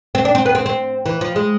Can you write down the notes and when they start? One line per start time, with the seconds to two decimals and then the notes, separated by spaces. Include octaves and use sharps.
0.15 C4
0.25 D4
0.35 C4
0.46 B3
0.55 C4
0.66 C4
1.06 E3
1.21 F3
1.36 G#3